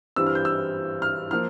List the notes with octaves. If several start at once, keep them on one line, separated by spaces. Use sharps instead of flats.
G2 E3 G3 C4 E6
F6
G6
E6
F6
F3 A#3 F6